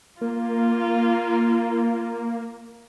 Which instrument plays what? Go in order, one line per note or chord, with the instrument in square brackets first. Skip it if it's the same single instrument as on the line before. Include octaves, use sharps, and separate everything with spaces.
[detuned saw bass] A#3 [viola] F4